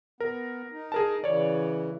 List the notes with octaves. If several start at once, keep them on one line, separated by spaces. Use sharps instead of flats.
B3 A#4
D#4
G#4 A#4 A5
C#3 E3 C#5 D5